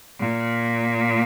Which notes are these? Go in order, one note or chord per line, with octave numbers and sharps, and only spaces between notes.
A#2